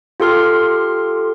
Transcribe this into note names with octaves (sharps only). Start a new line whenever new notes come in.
F4 G4 A4 C6 F6